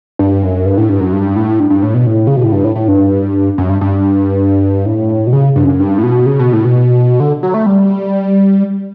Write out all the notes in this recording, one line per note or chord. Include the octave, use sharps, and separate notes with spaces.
G2
F#2
G2
A2
G2
F#2
G2
A2
G2
G2
A2
B2
A2
C#3
B2
A2
G2
A2
A2
G2
F#2
G2
G2
A2
B2
C#3
G2
F#2
G2
A2
B2
C#3
B2
A2
B2
D3
F#3
A3
G3